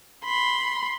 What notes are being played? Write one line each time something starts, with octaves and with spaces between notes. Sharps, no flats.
B5 C6